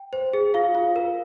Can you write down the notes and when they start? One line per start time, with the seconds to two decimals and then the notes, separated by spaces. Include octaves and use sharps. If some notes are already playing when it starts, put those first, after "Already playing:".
Already playing: G5
0.13 C5
0.33 G#4
0.54 F4 F5
0.75 F4
0.96 A#4